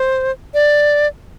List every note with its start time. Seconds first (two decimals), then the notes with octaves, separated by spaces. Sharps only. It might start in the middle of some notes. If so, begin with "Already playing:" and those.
Already playing: C5
0.54 D5